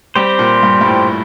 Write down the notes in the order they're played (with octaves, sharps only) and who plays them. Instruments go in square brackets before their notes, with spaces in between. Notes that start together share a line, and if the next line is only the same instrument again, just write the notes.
[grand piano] G3 [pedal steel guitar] C4 G4 C5
[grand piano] A#2
G2
G2
A2